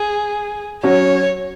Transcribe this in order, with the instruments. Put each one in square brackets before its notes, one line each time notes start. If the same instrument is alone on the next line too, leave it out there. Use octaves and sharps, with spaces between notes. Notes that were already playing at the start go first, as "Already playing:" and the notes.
Already playing: [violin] G#4
[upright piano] F#3 C#4 F#4 [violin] C#5